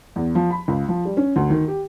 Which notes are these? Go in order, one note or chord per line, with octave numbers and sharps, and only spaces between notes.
E2
F3
B5
C#2
F3
G3
C#4
D2
D#3
G4